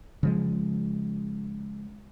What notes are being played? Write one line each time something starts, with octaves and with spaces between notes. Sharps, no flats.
C#3 F3 G#3